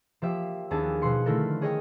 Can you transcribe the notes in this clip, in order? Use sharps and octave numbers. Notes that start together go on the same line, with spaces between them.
F3 A#3 G4 E5
D#2 B3 D4 G#4 E5 A5
B2 F3 F#5 C6 C#7
D3 D#3 A3 E4 A4 A#4
G#4 C#5 D#5 G5